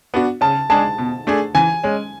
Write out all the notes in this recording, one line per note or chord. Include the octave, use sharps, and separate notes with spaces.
B3 D4 F#4
C#3 A5
G#3 D4 G#4 A5
B2
A3 D4 G#4
E3 G#5
G#3 C#4